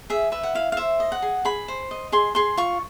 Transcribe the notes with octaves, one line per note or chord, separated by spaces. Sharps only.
G#4 E5
B4 E5
F#5
E4 F5
F5
C5 E5
D#5
F#5
G#4
G#4 B5
C5
D#5
G#4 C6
G#4 C6
F4 C#6